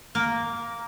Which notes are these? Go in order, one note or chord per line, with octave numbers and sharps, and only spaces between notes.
A#3 A#4